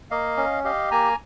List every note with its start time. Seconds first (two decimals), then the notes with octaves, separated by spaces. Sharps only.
0.11 A#3 D#5 F5
0.37 C#4
0.65 G4 D#5 F5
0.91 A#3 G#5 A#5